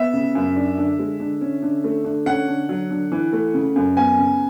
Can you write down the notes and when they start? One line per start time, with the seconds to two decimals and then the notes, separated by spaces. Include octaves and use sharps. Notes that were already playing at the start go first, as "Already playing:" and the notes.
Already playing: B3 E5
0.13 C#3
0.35 F#2
0.56 D4
0.78 D3
0.99 G#3
1.20 D3
1.41 C#4
1.62 D3
1.84 A3
2.04 D3
2.26 C#4 F#5
2.48 D3
2.69 F#3
2.91 D3
3.12 E3
3.33 A3
3.54 C#3
3.76 F#2
3.96 B3 G#5
4.18 C#3